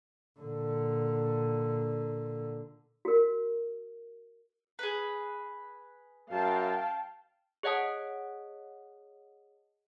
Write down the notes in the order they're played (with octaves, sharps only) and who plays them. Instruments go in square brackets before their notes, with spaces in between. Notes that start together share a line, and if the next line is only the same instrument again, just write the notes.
[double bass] A#2 D3
[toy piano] F#4 A#4
[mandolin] G#4 B4
[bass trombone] F#2 [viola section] F5 G5 A5
[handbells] G#4 C#5 D#5 F#5 A5 D#6